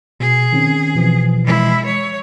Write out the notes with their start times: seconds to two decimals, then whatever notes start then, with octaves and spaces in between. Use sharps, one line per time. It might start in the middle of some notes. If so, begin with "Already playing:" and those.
0.20 B2 G#4
0.53 D#3 C4 C#4
0.95 B2 E3 F3
1.44 G#3 E4
1.85 C#5